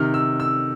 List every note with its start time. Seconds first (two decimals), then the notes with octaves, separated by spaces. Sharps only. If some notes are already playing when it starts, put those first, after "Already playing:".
Already playing: C3 D#3 F6
0.14 E6
0.40 E6